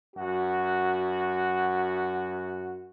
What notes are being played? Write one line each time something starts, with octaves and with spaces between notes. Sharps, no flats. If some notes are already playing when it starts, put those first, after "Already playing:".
F#2 F#4